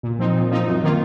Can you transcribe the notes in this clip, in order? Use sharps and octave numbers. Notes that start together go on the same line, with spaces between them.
A#2
F3 C4 D#4
A#2
F3 C4 D#4
F#2
D#3 A#3 F4